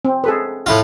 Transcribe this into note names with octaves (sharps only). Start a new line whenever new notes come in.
C4
G#4 A4 B4
A2 E4 F4